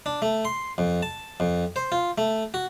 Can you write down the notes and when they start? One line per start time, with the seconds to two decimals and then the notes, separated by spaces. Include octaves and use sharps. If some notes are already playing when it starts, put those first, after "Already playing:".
0.06 D4
0.22 A3
0.45 C6
0.78 F2
1.03 A5
1.40 F2
1.76 C5
1.92 F4
2.18 A3
2.54 F#4